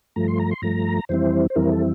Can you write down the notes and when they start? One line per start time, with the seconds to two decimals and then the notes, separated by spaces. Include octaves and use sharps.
0.16 G2 F3 A3 A#5
0.28 C6
0.39 A#5
0.51 C6
0.62 G2 F3 A3 A#5
1.09 F2 E3 G3 C4 E4 C5
1.50 C5
1.56 F2 E3 G3 C4 E4 A#4
1.72 A4